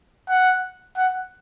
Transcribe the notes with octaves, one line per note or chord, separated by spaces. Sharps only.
F#5
F#5